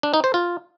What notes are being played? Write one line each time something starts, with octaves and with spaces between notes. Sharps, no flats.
D4
D#4
C5
F4